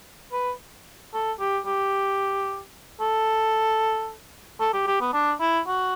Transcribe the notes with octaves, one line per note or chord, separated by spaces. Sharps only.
B4
A4
G4
G4
A4
A4
G4
G4
B3
D4
E4
F#4